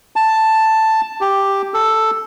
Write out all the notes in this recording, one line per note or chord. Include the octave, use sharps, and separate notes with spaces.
A5
G4
A4